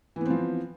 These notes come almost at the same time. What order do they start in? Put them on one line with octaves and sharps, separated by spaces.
E3 B3 C4 F3